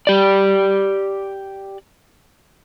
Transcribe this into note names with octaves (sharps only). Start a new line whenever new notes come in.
G4 D5